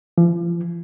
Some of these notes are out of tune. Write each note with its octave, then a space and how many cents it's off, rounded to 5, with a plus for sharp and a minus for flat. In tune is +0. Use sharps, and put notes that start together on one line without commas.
F3 -35